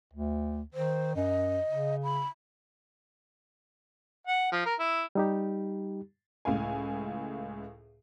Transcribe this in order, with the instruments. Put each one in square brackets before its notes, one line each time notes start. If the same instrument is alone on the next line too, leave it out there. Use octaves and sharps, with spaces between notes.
[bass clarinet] D2
[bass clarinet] D#3 [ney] C5
[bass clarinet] F#2 [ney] D#5
[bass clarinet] C#3
[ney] B5
[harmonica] F#5
F3
A#4
E4
[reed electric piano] G3 D#4 G4
[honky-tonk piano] C#2 A2 F5 G#5